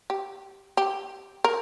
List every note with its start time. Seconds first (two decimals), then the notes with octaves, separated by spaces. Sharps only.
0.10 G4
0.77 G4
1.44 A#4